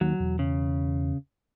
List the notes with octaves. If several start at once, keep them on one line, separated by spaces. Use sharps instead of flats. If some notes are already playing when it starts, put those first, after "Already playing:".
D#2 F#3
E1
C#3